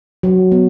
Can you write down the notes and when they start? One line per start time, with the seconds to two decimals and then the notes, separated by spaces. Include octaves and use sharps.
0.23 F#3
0.52 B3